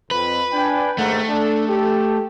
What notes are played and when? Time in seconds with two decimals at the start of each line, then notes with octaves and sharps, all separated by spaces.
0.11 F2 B4
0.53 D4 G5 G#5
0.98 D#2 G#2 A3 F#5
1.29 D4 A4
1.68 G4 A4